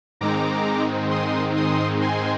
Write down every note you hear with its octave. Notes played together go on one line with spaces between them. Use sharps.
G#2 D#3 G#3 C4 D#4 A#5 D6
C6 D#6
C6 D#6
G#5 C6